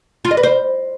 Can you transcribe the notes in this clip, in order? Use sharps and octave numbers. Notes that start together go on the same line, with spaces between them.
F4
D#5
B4
C5